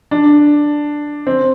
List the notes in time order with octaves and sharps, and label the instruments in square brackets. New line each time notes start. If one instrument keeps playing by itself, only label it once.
[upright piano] D4
C4